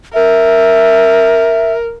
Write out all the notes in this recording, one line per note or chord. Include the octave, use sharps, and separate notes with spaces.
A#4 E5